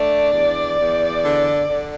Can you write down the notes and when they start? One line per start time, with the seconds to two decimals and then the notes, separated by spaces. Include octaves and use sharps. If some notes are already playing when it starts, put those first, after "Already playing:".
Already playing: A3 D4 D5
0.32 E2
0.79 E2
1.24 D3
1.69 D3